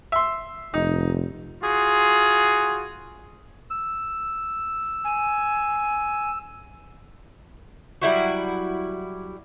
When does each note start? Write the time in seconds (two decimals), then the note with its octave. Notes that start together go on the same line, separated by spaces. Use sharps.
0.12 E5 C6
0.74 F1 D#4
1.62 F4 F#4 G#4
3.70 E6
5.04 G#5
8.02 F#3 G3 E4 F#4